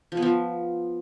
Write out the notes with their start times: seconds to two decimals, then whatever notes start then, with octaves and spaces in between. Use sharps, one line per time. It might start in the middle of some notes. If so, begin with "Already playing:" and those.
0.12 F3
0.17 B3
0.22 F3